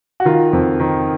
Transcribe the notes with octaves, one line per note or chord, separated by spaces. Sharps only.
F#4
D#3 F4
F2
D#3